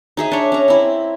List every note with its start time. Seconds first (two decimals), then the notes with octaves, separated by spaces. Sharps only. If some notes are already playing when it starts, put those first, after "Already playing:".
0.17 D#4 G#4 E5
0.31 D4 C#5
0.52 C#4 A#5
0.68 C4 E4